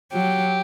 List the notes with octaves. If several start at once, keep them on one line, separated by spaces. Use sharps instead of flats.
F#3 G4